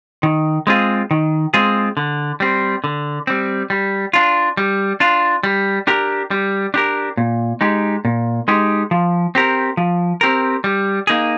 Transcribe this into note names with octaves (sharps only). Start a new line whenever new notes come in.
D#3
G#3 C4 F4 G#4
D#3
G#3 C4 F4 G#4
D3
G3 C4
D3
G3 C4
G3
D4 F4
G3
D4 F4
G3
D4 G4 A#4
G3
D4 G4 A#4
A#2
G#3 D#4 G4
A#2
G#3 D#4 G4
F3
C4 G4 A#4
F3
C4 G4 A#4
G3
A#3 D#4 G#4